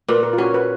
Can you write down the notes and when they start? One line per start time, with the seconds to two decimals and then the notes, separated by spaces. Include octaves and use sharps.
0.08 A#2 B4
0.23 A#4
0.33 F4
0.38 C#4 F#4
0.54 B4